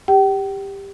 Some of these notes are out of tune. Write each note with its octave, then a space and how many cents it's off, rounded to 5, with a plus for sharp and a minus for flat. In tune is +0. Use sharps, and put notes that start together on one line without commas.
G4 +15 G5 -40